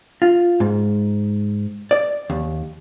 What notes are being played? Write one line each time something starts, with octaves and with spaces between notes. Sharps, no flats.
F4
G#2
D5
D#2